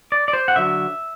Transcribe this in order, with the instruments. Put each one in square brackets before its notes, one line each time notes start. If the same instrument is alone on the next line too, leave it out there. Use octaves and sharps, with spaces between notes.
[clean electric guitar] D5
D5
C5
F#5
D3 F#3 E5